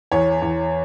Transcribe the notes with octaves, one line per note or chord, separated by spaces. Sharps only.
E2 C#5
E2